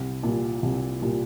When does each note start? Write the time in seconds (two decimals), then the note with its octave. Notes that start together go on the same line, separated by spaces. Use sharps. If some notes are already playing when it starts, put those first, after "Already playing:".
Already playing: C2
0.23 A#2 G3
0.63 C2
1.02 A#2 G3